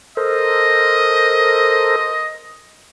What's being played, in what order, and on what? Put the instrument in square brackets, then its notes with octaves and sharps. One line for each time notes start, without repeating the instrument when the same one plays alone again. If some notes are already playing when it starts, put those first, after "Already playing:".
[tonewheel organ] A4 A#4 C5 [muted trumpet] D#5